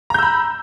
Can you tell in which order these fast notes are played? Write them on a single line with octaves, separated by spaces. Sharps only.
A#5 G6 E6 B5